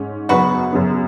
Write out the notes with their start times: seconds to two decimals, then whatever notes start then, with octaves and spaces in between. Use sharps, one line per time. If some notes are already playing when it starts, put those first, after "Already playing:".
Already playing: G#2 G#3 C#4
0.29 F#2 C#3 F#3 B3 F#4 B4
0.73 F#2 C#3 F#3 B3